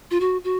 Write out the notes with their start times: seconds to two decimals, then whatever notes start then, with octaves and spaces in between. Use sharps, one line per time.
0.11 F4
0.20 F#4
0.44 F#4